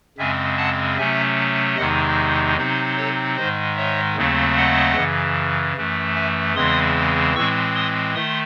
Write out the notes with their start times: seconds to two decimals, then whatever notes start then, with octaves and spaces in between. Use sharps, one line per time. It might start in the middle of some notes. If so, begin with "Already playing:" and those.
0.18 F#2 C#3 G#3 C4 E5 G#5
0.57 F#5 A5
0.97 C3 F#3 A3 C#4 E5 G#5
1.77 E2 C3 D#3 G#3 D#4 D#5 F#5
2.57 C3 F#3 C4 D#4
2.97 A4 C#5
3.36 G#2 D#3 G#3 C5 D#5
3.76 C#5 E5
4.16 D#2 C#3 F#3 A3 C4
4.56 D#5 F#5
4.96 F#2 C#3 E3
5.77 F#2 E3 A3
6.15 E5 G#5
6.55 E2 C#3 E3 G#3 C4 C6 D#6
7.35 A2 E3 G#3 C4 C#6 E6
7.75 C6 D#6
8.15 D#3 A3 C6 D#6